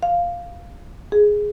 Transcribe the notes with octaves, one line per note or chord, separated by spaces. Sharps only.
F5
G#4